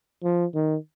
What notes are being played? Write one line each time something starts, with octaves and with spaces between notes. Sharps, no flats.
F3
D#3